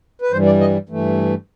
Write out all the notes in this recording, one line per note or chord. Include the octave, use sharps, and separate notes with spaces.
B4
G2 E3 G3 C5
D5
D#5
G2 E3 A3